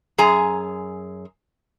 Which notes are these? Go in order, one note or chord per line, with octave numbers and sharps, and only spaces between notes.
F#2 G#4 G#5 A#5